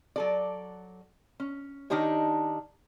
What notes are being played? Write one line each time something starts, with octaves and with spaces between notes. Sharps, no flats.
F#3 A4 D5
C#4
D#3 D4 D#4 G4 C#5